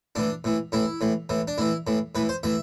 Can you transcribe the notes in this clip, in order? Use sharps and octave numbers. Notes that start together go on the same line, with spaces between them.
A2 E3 D4
A2 E3
A2 E3 E4
A2 E3
A2 E3
D4
A2 E3 E4
A2 E3
A2 E3 B4
C5
A2 E3 E5